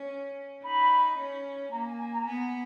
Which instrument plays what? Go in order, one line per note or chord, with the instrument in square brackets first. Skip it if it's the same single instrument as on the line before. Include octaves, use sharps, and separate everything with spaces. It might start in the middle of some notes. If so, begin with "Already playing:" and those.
Already playing: [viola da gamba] C#4
[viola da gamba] D#4 [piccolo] B5
[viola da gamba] C#4
[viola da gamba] A#3 [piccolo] A#5
[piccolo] G#5
G#5
A#5
[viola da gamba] B3 [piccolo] G#5